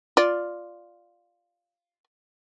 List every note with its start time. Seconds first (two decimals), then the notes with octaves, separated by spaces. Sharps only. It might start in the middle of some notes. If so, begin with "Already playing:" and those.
0.17 F4 D5